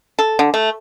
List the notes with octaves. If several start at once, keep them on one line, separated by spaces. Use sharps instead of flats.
A4
D3
A3